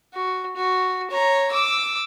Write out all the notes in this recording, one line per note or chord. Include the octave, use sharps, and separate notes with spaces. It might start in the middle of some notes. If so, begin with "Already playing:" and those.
F#4
F#4
C#5 A#5
D6 E6